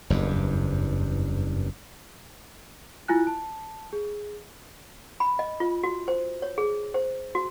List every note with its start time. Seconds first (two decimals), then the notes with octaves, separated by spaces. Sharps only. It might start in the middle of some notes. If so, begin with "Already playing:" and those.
0.10 F#1 E2 G2
3.08 E4 F4 G#5 F#6
3.27 A5
3.93 G#4
5.20 B5
5.39 D#5
5.60 F4
5.83 F#4
6.08 C5
6.42 C#5
6.58 G#4
6.94 C5
7.35 F#4